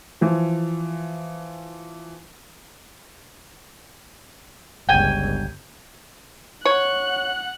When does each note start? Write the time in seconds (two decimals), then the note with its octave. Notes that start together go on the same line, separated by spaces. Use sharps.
0.21 E3 F3
4.89 G1 C#2 G5 G#5
6.65 C#5 F#5 F#6